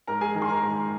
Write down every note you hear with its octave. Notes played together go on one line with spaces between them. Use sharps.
G#2 A#4 A#5
G#4 G#5
D#3 A#4 A#5
C6
A#4 A#5
G#2